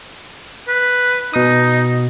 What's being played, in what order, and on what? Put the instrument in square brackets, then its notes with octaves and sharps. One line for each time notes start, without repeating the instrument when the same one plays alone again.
[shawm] B4
[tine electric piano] B2 D#6 [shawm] D#4